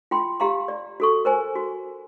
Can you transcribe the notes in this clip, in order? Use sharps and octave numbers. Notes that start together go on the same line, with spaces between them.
F4 G5 C6
G4 F5 A#5 C6
D5
F#4 A4 C#6
A#4 C5 G#5
F#4